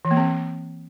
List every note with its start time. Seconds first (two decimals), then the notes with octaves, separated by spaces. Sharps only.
0.05 E3
0.11 A#3
0.17 C4